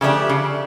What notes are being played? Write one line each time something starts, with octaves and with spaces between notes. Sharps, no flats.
C#3 F3 A3 D4 G4
C#3